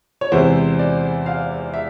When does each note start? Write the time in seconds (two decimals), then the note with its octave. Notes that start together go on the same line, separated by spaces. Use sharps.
0.21 C#5
0.32 E2 C3 E3 G#3 C5
0.79 D5
1.26 F5
1.74 E5